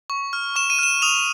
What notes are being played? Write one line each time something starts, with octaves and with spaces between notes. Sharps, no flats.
C#6
F6
C#6 E7
D#7
F6 E7
D#6 F7